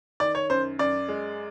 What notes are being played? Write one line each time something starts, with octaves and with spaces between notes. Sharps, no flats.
D#3 D5
C#5
F#2 C5
F#2 D5
G#3